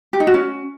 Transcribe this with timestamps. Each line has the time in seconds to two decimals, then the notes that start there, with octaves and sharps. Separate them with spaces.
0.13 G4
0.20 D#4
0.27 F#4
0.34 C#4